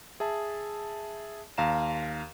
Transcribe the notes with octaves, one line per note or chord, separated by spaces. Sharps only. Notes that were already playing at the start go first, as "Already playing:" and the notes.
G#4 E5 A5
D#2 F5 A#5 E7